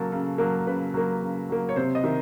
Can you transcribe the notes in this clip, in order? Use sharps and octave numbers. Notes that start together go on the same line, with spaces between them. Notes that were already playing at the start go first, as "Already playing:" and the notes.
Already playing: C#3 F#3 A#3 A4
C#3
F#3 A#3
C#3 B4
F#3 A#3
C#3
F#3 A#3
C#5
C3 C5
D#5
D#3 E5